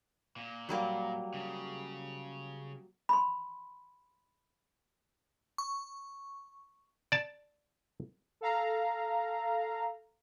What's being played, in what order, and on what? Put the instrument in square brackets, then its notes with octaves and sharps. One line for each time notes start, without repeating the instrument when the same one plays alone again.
[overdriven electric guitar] A#2
[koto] F#3 G3 A#3
[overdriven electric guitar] C#3
[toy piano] B5 C6
[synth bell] C#6
[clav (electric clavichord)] D5 A5
[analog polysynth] A4 F5 A#5